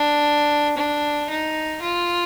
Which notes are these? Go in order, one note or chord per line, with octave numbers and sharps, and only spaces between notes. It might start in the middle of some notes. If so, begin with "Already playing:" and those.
Already playing: D4
D4
D#4
F4